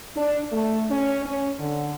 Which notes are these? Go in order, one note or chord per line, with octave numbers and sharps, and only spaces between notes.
D4
A3
C#4
C#4
D3